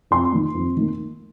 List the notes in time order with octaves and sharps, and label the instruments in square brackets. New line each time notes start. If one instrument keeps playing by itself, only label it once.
[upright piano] F2 C6
D#3 A#3
F2
D#3 A#3